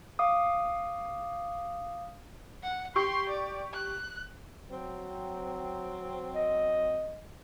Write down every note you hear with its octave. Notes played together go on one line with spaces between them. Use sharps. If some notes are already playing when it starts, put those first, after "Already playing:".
F5 D6 D#6
F#5
G4 C6 C#6
D5
F#6
F#3 C4
D#5